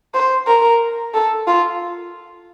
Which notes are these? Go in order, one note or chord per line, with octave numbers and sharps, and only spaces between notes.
C5
A#4
A4
F4